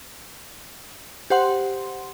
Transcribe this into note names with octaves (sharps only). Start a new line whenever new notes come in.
G4 C5 F#5 C6